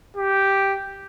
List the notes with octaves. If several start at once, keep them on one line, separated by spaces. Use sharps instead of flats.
G4